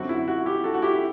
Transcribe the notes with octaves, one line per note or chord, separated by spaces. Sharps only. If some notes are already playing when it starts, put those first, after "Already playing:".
Already playing: F#2 D3 F#3 C4 F#4
E4
F#4
E4 G4
F#4 A4
F#4
E4 G4
G4